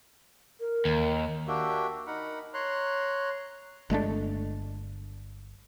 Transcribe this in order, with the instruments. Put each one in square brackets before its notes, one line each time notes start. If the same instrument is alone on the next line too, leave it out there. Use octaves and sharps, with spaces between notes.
[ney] A#4
[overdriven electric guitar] D#2
[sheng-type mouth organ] A#3 D4 F#4 G4 E5 G5
D#4 A#4 F#5 B5
C#5 A#5 C6 F#6
[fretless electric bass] G1 G#3 A3 D4